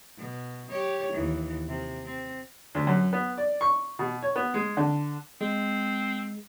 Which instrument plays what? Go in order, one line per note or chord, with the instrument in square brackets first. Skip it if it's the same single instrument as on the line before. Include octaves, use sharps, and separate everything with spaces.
[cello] B2
G4 C#5
D#2 E3
C3
C4
[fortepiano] D2
F#2
B3
D5
C#6
B2
C#5
B3
G#3
D3
[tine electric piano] G#3 [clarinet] C4